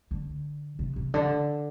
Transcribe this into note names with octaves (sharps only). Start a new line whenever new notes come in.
D3
C3
C3
D3